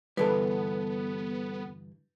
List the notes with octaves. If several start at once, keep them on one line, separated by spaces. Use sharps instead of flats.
G2 D3 E3 G3 B3 A4 B4